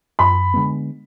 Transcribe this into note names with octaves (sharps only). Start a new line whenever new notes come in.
F#2 B5
D3 G#3 B3